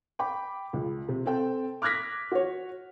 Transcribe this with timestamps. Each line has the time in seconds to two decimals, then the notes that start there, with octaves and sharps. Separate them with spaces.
0.19 G5 B5 D6
0.73 C#2
1.08 C3
1.26 C4 A4 G5
1.82 D6 F6 F#6 G#6 A#6 B6
2.32 F#4 C#5